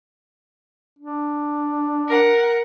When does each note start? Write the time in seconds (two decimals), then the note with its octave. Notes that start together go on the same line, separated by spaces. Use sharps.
0.99 D4
2.07 A#4 F#5